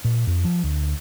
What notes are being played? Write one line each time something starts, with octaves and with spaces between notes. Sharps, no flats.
A#2
F2
F3
D2